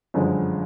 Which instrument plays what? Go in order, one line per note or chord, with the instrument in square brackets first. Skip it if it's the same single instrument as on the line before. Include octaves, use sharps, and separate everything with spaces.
[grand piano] G1 F#2 D3 F3 G#3